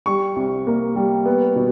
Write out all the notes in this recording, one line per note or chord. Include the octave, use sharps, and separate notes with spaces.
G3 C#6
C2
A#3
G3
B3
B2